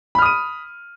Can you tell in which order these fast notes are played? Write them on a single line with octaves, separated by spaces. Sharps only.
B5 F6 D#6 D#7